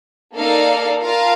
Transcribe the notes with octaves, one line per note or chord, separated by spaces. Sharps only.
A#3 D#4 A4 D5 F5
F4 A#4 F5 A5